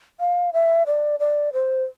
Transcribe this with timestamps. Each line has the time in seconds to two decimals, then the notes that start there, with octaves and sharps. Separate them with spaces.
0.20 F5
0.53 E5
0.86 D5
1.20 D5
1.53 C5